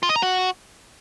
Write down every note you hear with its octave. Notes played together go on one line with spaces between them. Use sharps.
F4
D#5
A#5
F#4